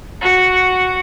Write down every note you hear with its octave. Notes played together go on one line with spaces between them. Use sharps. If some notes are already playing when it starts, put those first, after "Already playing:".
F#4 F#5